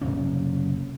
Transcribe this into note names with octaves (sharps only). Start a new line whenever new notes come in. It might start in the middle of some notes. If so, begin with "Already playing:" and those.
F#1 C2 C3 C#4